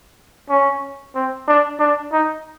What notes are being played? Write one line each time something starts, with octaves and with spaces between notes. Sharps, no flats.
C#4
C4
D4
D4
D#4